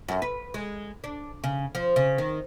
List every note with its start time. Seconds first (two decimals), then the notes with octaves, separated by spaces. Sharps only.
0.08 F#2
0.22 B4
0.54 G#3
1.04 D4
1.44 C#3
1.75 F3
1.96 C#3
2.18 D#3